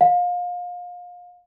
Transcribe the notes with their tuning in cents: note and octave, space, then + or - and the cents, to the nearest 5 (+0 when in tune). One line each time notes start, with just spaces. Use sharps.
F5 +30